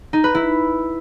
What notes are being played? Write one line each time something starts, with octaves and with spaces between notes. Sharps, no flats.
D#4
B4
E4